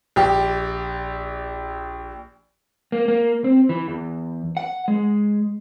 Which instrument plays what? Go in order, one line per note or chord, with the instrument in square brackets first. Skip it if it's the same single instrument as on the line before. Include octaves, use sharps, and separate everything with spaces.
[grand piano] A#1 G4
[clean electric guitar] A#3
A#3
C4
E3
E2
F#5
G#3